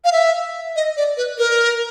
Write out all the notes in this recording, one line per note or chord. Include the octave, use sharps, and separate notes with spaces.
F5
E5
D#5
D5
B4
A#4